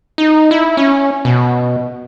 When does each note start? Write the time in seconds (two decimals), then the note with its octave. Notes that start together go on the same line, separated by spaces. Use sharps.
0.18 D#4
0.51 E4
0.77 C#4
1.25 B2